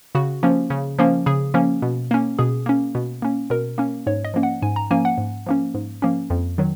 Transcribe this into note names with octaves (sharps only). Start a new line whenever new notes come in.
C#3 F#4
F3 A#3 C#4
C#3
F3 A#3 C#4
C#3 G#4
F3 A#3 C#4
B2
A#3 C#4
B2 G#4
A#3 C#4
B2
A#3 C#4
B2 A#4
A#3 C#4
G#2 C#5
D#5
F3 A#3 C#4
F#5
G#2 G#5
A#5
F3 A#3 C#4 G#5
F#5
G#2
F3 A#3 C#4
G#2
F3 A#3 C#4
F2
D#3 F#3